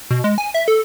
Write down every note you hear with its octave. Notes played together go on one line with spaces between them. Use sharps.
B2
G#3
G#5
E5
A4